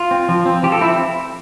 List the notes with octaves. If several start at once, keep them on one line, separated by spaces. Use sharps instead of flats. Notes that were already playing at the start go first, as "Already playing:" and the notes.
Already playing: F4
C4
F3
C4
F3 G4
A4
C4 E4